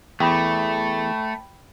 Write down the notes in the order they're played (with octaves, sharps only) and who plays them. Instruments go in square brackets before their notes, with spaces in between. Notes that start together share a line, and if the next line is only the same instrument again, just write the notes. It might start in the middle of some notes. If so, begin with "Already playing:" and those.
[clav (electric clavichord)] E2 [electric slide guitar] A3 [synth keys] G5 B5